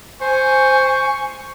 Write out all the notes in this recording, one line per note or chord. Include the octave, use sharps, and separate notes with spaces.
C5 G#5 C#6